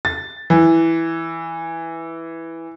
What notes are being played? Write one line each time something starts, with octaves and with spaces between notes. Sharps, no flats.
A6
E3